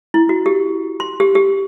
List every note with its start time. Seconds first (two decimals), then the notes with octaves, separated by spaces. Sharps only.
0.14 E4
0.29 F#4
0.46 G4
1.00 C6
1.20 G4
1.35 G4